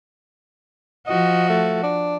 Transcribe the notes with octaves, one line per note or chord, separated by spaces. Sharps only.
F3 F#4 D#5
A3
D4